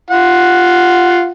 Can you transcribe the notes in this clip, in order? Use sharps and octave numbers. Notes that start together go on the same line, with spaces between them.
F4 F#5